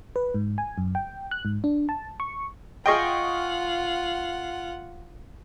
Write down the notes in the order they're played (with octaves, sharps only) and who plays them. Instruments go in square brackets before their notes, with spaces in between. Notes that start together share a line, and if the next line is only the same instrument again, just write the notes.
[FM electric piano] B4
G#2
G#5
F#2
G5
F#6
G#2
D4
A5
C#6
[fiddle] F4 F#5 [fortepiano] G#4 D#5 G5 [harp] C6 C#6 F6